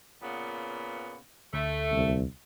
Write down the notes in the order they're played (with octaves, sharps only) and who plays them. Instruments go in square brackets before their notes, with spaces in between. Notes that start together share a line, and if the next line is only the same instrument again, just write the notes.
[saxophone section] A#2 C#3 B3
[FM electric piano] D2 [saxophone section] A3
[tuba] C2